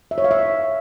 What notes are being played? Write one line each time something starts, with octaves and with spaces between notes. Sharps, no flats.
E5
C#5
F5
E5